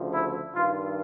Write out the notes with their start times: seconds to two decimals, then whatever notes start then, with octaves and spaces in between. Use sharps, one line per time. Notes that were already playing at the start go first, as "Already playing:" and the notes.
Already playing: D2 C#3 F3
0.12 E4
0.54 G2 D#3 F4